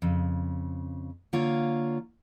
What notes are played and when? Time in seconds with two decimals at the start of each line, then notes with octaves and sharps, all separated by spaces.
0.02 F2 C#3
1.33 D3 A#3 F4 C#5